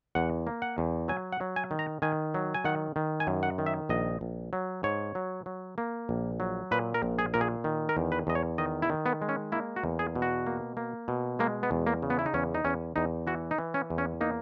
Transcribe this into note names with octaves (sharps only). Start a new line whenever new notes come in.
E2 F#5
A#3
F#5
E2
F#3 G#5
F#5
F#3
G#5
D#3
A#5
D#3 G#5
F#3
G#5
D#3 F#5
D#3
G#5
F#2
F#5
D#3
E5
A#1 D#5
A#1
F#3
G#2 C#5
F#3
F#3
A#3
A#1
F#3
A#2 B4
A#4
A#1
G#4
A#2 A#4
G#4
D#3
A#4
E2
B4
E2 D#5
C#5
D#3 D#5
E4
D#3
B3
G#3
C#4
A#3 E4
F#4
E2
G#4
B2
F#4
A#3
A#3
B2
G#3 A#3
B3
E2
A#3
C#3
B3
E4
D#4
E2 C#4
D#4
E2 C#4
E2 D#4
E3 F#4
D#4
E3
C#4
E2
C#4
A#3 D#4